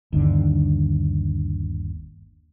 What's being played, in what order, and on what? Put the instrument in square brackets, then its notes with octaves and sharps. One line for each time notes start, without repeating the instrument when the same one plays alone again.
[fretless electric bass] G1 D#2 D3